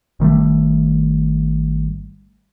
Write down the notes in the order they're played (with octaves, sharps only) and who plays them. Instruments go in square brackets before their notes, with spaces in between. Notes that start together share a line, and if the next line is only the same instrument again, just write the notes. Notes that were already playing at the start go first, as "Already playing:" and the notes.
[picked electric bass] G#1 D#3 G3 A3